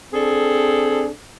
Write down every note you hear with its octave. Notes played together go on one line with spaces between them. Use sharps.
C4 D4 G#4 A4